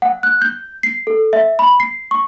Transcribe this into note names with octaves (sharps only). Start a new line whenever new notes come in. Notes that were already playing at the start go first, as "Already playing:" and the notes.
F#5
F#6
G6
C7
A4
E5
B5
C7
C#6